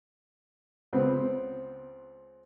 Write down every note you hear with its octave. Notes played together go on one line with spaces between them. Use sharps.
C#2 B3 C4